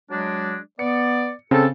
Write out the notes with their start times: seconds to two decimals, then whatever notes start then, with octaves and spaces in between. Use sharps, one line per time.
0.10 F#3 G#3 D4
0.79 B3 D5 C#7
1.51 C#3 C4 A4